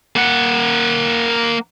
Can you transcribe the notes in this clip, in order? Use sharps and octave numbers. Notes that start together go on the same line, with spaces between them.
A#3 F#5